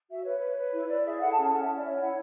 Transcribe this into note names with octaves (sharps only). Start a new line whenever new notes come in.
F#4 E5
B4 C#5
B4
B4
E4
E4 D5
G#4 E5
E5
A4 F#5
A5
C#4
A5
C#4 F#5
E4 E5
D5
C#5 E5
G#5
E4 F#5